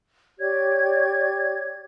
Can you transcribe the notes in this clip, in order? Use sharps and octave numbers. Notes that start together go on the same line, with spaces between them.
G4 C#5 D5 G#6